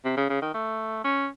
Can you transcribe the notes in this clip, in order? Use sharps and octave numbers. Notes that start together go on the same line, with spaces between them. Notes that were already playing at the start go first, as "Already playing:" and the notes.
C3
C#3
C#3
D#3
A3
C#4